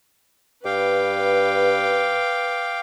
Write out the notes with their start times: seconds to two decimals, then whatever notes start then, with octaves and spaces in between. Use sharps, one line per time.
0.65 G2 B4 F5 G5 D6